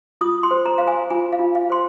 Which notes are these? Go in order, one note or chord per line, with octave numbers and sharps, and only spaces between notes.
F4 D#6
C6
C5
A#5
C5 F5
G#5
F4 G#5
F5
F4
F5
C5 C6